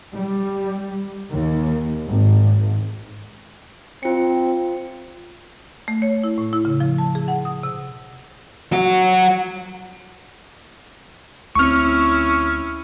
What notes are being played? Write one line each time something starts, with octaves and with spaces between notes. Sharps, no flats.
G3
D#2
G#1
C4 F4 C#7
A3
C#5
E4
A2
E4
C#3
F3
A5
G#4
F#5
D#6
C3
F#3 F#4
D2 C4 C#4 E4 C#6 F6